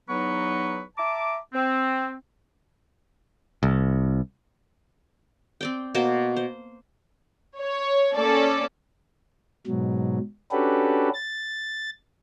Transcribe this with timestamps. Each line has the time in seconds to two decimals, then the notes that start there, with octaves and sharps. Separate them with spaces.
0.09 E2 F#3 B3 D#4 B4 C#6
0.98 E5 A5 A#5 D6
1.54 C4
3.63 C2
5.61 C4 D5 G5
5.95 B2 A#3 C5 A5
6.36 C5
7.58 C#5
8.15 A#3 C#4 A4 D5
9.67 G#2 B2 F#3
10.52 C#4 D4 F#4 G4 A4 B4
11.14 A6